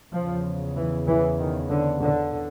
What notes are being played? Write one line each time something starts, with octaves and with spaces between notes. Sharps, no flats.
E2 C#3 F3
E3
E3
D#3
D3
D3